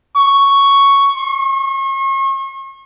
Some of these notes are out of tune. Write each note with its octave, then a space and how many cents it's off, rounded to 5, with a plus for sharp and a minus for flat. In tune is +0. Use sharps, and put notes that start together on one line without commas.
C#6 +5
C#6 -40